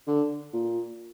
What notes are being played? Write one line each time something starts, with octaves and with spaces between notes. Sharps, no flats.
D3
A#2